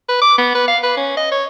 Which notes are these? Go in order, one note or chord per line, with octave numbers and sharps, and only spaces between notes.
B4
D6
B3
B4
F5
B4
C#4
D#5
C#5